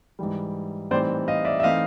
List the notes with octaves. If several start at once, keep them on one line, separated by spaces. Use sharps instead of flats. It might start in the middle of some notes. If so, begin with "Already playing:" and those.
G#2 E3 G3
A2 E3 G3 C4 D#4 C5 D5
D#5 F5
D5 E5
E5
E3 A3 C4 D#4 D#5 F5